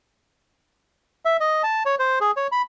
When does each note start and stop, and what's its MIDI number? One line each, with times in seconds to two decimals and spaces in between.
1.25 1.37 76
1.40 1.62 75
1.63 1.83 81
1.86 1.95 73
1.99 2.19 72
2.21 2.31 68
2.37 2.47 73
2.52 2.62 83